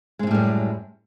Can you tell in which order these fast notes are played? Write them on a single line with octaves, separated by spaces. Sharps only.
G#3 C#3 A2 G3 F#2